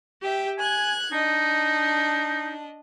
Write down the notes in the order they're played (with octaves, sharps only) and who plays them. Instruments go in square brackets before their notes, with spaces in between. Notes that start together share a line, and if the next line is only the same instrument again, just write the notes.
[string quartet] G4 E5 G5
[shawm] G#5 [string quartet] F#6 G#6
[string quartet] D4 D#5 [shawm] D#4